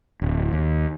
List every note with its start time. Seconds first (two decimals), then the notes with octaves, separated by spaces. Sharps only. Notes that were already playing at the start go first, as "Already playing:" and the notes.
0.22 D1
0.53 D#2